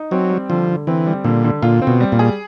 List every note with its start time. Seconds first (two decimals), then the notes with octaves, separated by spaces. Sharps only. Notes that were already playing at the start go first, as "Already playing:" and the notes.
Already playing: D#4
0.11 F#3 C4
0.30 G3
0.50 D3 F3
0.68 D3
0.87 E3 C4
1.06 G3
1.24 A#2 D3
1.44 D3
1.63 A#2 F4
1.82 C4
1.87 B2
2.00 G3
2.12 A#2
2.19 G#4